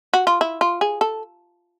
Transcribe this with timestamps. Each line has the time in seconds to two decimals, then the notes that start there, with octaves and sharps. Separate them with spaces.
0.13 F#4
0.27 F4
0.41 E4
0.61 F4
0.81 G#4
1.01 A4